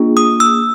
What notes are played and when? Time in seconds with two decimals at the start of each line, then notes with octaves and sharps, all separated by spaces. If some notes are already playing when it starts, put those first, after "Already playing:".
Already playing: A#3 D4 F4 G#4
0.17 D#6
0.40 E6